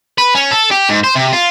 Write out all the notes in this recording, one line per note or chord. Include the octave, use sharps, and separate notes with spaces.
B4
C#4
A4
G4
G#2
C5
C3
F4